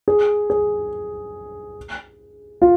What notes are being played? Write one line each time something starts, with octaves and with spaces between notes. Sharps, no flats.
G#4
G#4
F4